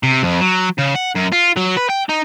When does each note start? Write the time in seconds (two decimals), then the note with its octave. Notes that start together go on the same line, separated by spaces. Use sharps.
0.03 C3
0.23 F2
0.41 F#3
0.79 C#3
0.96 F#5
1.16 F#2
1.33 F4
1.57 F#3
1.77 B4
1.89 G5
2.09 D#4